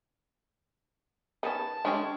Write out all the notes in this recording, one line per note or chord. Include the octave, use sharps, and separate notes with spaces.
D#3 B3 C#4 A5
D3 G#3 C#4 D4 G4